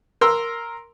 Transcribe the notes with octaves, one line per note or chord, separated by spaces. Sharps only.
A#4 C6 E6